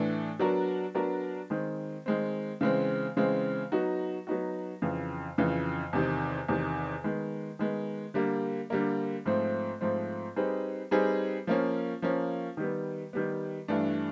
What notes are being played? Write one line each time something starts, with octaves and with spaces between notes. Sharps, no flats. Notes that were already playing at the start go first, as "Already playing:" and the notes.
Already playing: A2 E3 A3 D4
F#3 B3 D4 F#4 A#4
F#3 B3 D4 F#4 A#4
D#3 G#3 C4
D#3 G#3 C4
C#3 E3 G#3 C4
C#3 E3 G#3 C4
F#3 B3 D#4 F#4
F#3 B3 D#4 F#4
F2 C#3 E3
F2 C#3 E3
E2 C3 D#3
E2 C3 D#3
D#3 G#3 B3
D#3 G#3 B3
D3 G3 A#3
D3 G3 A#3
G#2 F3 A3 C4
G#2 F3 A3 C4
G3 C4 D#4 G#4 B4
G3 C4 D#4 G#4 B4
F3 A#3 C#4
F3 A#3 C#4
D#3 G3 B3
D#3 G3 B3
G2 E3 A3 D4